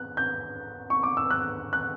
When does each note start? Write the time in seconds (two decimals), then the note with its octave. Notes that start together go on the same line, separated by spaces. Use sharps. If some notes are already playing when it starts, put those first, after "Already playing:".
Already playing: F#6
0.17 G6
0.90 C#6
1.03 D6
1.17 E6
1.30 F#6
1.73 F#6